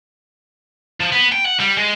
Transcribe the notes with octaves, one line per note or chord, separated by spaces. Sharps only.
F3
B3
G5
F#5
G3
G#3